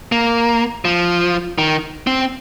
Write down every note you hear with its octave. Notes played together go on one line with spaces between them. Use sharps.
A#3
F3
D#3
C4